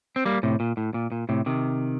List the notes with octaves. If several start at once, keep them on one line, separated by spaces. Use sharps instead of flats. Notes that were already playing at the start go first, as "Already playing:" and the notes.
C4
G3 A#3
A2 C3
A#2
A2
A#2
A#2
A2 C3
C3 D#3